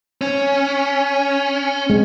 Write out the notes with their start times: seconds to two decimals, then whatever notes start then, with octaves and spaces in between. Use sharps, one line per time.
0.21 C#4
1.90 G#3 C4